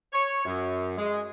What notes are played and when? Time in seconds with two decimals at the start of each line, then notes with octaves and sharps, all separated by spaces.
0.13 C#5
0.45 F#2
0.97 G#3